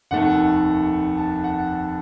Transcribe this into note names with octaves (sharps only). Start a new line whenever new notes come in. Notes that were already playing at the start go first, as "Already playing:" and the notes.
F1 D#2 D#3 A3 F#5
A5
F#5